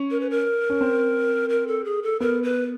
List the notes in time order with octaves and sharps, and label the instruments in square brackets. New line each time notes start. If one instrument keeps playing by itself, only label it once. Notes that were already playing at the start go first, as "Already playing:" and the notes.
Already playing: [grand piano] C#4
[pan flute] A#4
B4
A#4
[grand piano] C#4
C4
[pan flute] A#4
A4
G#4
A4
[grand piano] B3 [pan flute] A#4
[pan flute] B4